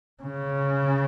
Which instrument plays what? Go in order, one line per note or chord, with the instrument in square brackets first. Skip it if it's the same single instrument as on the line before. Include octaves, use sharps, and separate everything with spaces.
[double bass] C#3